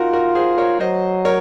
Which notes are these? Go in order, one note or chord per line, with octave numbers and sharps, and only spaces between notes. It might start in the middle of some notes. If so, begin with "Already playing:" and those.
Already playing: D#4 F4 F#4 A#4
F#4 A#4
G#4 C5
A#4 C#5
F#3 C5 D#5
A#4 C#5